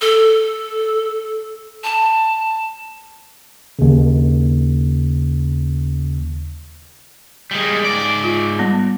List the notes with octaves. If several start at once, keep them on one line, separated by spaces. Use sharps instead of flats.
A4
A5
D#2 C#3
G3 G#3
G#2 D5
F4
G3 B3